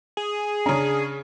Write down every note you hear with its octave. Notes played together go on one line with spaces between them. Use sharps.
G#4
C#3 C#4 D4 A#5